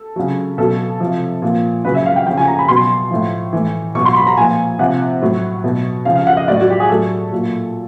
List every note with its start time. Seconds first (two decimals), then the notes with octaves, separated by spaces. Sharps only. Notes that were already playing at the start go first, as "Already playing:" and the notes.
Already playing: A4
0.16 C#3 F#3
0.58 B2 F#3 A4
1.00 C3 F3
1.42 A#2 F3
1.84 C#3 F#3 B4
1.95 E5
2.06 F5
2.16 G5
2.26 F3 G5
2.30 C#3
2.37 G#5
2.47 A#5
2.59 B5
2.68 B2 F#3 C6
3.11 A2 F3
3.53 A2 E3
3.95 B2 F#3 C#6
4.05 C6
4.16 B5
4.27 A#5
4.37 A#2 F3 G#5
4.79 C3 F3 F#5
5.21 A2 F#3
5.64 B2 F#3
6.05 C#3 F3 F5
6.15 F5
6.27 F#5
6.37 D#5
6.48 A2 F#3 D5
6.61 F#4
6.70 G4
6.80 G#4
6.89 A2 F#3 A4
7.32 A#2 F#3